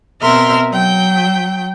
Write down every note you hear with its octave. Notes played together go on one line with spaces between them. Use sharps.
B2 C4 A#4 E5 C6 F6
F#3 G5